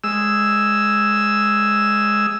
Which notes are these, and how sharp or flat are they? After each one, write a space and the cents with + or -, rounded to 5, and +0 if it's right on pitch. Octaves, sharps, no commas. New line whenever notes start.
G#3 +0 E6 +0